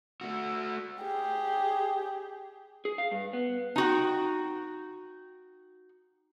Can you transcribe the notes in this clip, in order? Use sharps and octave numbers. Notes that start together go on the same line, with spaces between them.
A3 F#4
G4 G#4
G#4
F5
G2
B3
D#4 F#4 G5